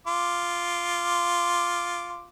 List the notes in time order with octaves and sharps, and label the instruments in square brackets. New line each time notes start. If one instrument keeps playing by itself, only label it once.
[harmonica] F4 D6